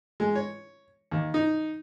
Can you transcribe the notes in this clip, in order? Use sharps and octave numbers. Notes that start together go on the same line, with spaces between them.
G#3
C#5
D#2
D#4